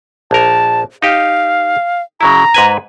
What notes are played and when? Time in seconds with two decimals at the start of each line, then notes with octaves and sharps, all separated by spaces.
0.31 A#1 A#4 A5
1.02 D#4 G4 F5
2.21 C#3 F#3 E4 A#5
2.54 G#2 B4 G#5